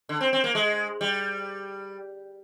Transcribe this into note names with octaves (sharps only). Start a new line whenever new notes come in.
D3
C4
C4
A#3
G#3
G3